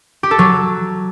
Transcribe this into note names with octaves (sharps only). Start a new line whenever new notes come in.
G4
A4
F#3